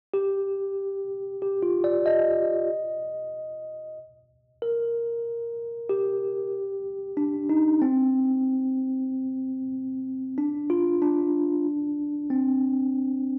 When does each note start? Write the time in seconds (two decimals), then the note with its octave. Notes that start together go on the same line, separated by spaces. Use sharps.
0.14 G4
1.42 G4
1.63 F4
1.84 D5
2.06 D#5
4.62 A#4
5.89 G4
7.17 D4
7.49 D#4
7.82 C4
10.38 D4
10.70 F4
11.02 D4
12.30 C4